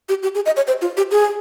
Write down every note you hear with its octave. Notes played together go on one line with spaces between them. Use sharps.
G4
G4
G#4
D#5
C#5
C5
F4
G4
G#4